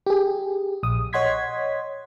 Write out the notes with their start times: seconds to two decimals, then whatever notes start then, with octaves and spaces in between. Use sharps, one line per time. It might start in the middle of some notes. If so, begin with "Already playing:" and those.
0.06 G4 G#4
0.83 A#1 D#6
1.13 C#5 D#5 F#5 C6 G#6 B6